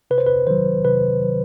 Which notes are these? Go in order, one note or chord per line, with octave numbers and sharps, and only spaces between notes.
C3 B4
C5
B4
D#3 F#3 C5
C3 B4
D#3 F#3